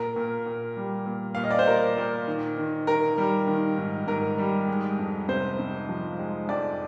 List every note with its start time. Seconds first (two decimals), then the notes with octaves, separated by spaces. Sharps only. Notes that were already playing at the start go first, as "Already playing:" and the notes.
Already playing: A#2 A#4
0.16 A#2
0.46 A#2
0.77 G3
1.06 A#2
1.35 A#2 F5
1.44 D#5
1.51 D5
1.59 C5
1.67 A#2 A#4
1.97 A#2
2.27 D#3
2.57 D#3
2.87 D#3 A#4
3.18 G3
3.47 D#3
3.78 G#2
4.07 G#2 A#4
4.38 G3
4.68 G#3
4.99 F2
5.28 C3 C5
5.59 C3
5.89 F3
6.19 G#3
6.49 F2 D5